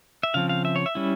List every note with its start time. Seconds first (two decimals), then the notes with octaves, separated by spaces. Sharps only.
0.23 E5
0.34 C#3 F3 C4 F5
0.49 F5
0.65 E5
0.76 C#5
0.86 E5
0.95 G3 C#4 E4